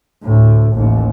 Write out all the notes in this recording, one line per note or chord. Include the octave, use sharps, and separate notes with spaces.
D2 A2
A1 D#2